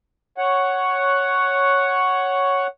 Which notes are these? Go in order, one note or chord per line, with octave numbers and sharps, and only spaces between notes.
C#5 F#5